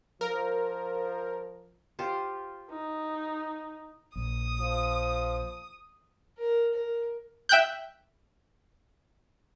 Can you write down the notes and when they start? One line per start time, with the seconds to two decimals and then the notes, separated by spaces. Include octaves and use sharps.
0.21 F3 A#4
1.99 F4 G4 C5
2.69 D#4
4.16 A#1 D#6
4.60 F3
6.38 A#4
6.74 A#4
7.49 E5 G5 F#6 G6